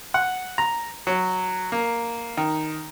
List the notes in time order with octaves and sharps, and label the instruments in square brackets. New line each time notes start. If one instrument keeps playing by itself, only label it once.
[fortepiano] F#5
A#5
F#3
A#3
D#3